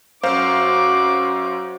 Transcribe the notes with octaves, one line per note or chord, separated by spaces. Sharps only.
F#2 F#4 C5 F5 D6